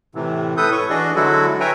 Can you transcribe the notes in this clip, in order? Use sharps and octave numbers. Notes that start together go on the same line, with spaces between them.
A2 C3 E3
A2 A4 B4 D#6 G6
C#5 C#6
E3 D4 F#4 G#4 D5 D#5
D3 F#3 G#3 E4 F#4 A4
B4 C#5 E5 G5 G#5 A#5